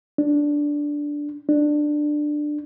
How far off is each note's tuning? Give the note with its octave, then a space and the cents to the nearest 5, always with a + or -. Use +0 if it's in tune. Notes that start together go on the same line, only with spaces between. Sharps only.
D4 -5
D4 +15